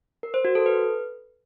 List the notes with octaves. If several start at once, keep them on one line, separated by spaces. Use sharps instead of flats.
A#4
C5
F#4
A4
B4